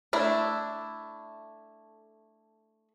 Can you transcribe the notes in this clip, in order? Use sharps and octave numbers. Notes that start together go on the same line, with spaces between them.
A3 D4 E4